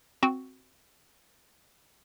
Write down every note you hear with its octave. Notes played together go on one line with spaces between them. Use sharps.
C4 F#4